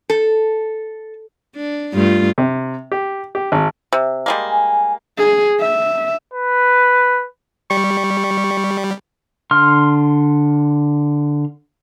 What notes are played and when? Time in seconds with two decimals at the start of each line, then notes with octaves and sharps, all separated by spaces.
0.10 A4
1.55 D4
1.94 G2 A3 F4
2.38 C3
2.92 G4
3.35 G4
3.52 G#1
3.92 C3
4.26 G3 G#3 A#3
4.50 G#5
5.18 G#4
5.60 E5
6.34 B4
7.70 G3 C#6
9.51 D3 C6 F6